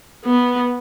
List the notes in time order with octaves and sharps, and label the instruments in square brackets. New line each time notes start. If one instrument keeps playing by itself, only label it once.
[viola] B3